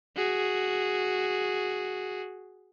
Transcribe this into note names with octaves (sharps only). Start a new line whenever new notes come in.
F#4 G#4